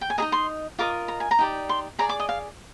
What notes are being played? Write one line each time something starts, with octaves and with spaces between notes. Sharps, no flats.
G5
G#5
D#4 G#4 D#5 A#5
C6
F4 A#4 D#5 D6
A#5
G#5
A#5
D#4 G4 D5
C6
G#4 D5 A#5
D6
D#5
F5